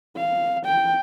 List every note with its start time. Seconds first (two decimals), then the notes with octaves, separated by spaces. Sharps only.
0.17 F5
0.65 G5